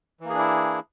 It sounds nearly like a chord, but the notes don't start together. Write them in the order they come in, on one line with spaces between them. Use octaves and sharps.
E3 A#3 G#4 D4 E4